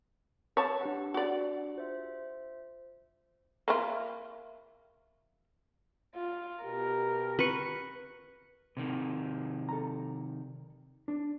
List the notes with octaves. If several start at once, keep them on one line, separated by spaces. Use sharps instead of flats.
B4 C#5 A5
D4 G4 F#5
F#4 D5
F4 C5 E5
A#3 E4 F4
F4
B2 G4 A#4
B4 C#6
C3 D#3
A4 A#5
D4